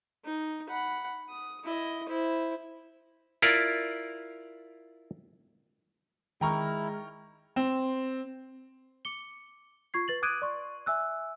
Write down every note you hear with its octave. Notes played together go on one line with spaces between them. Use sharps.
D#4
F#5 B5
D#6
E4 D#5
E4 C5
E4 F4 A#4 D5
D#3 G#3 E4 G5 A#5 C#6 F6
C4
D6 C#7 G7
F4 C#6 G#6 C7
B4 A6 F#7
D6 D#6 F#6 G#6 D7 D#7
D5 C6 C#6
E5 G#5 E6 F#6